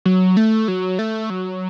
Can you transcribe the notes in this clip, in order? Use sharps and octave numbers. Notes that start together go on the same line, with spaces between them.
F#3
A3
F#3
A3
F#3